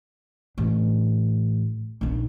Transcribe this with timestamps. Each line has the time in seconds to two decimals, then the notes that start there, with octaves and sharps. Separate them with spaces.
0.58 A1 D4
2.01 A#1 D#4